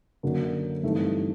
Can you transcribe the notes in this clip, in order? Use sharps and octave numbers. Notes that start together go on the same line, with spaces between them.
F#2 D3 F#3 A#3 D4
G2 E3 A3 C4 D#4